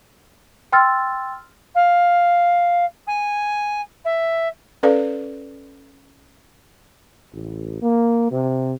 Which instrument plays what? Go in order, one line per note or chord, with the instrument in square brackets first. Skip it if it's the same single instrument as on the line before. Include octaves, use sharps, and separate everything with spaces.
[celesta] G5 C6 E6 F6 A6
[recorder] F5
G#5
E5
[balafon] C#4 A4 B4 D5 F5
[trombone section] A1
A#3
C3